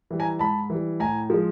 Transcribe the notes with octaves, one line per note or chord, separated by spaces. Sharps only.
E3 G3
G#5 A#5
G#2 A5 B5
E3 G3
A2 G#5 A#5
F3 G#3